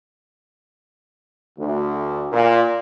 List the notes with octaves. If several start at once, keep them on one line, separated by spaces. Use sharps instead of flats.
D2
A#2